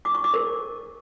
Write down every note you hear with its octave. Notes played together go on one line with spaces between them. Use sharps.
D6
C#6
D6
A#4